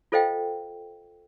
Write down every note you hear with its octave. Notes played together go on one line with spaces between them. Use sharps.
F4 A4 C5 D#5 F5 G5